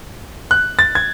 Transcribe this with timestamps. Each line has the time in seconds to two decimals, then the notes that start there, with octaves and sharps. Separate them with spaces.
0.51 F#6
0.79 A6
0.95 G#6